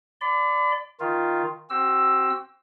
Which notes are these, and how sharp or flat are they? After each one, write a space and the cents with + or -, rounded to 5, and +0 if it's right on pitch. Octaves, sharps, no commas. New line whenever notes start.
D5 +0 B5 +40
D#3 +10 F4 +0
C4 +15 F#4 +40 E6 +5